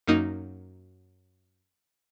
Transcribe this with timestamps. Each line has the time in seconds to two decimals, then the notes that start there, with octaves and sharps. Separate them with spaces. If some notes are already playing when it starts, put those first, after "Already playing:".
0.07 F#2 A#3 D#4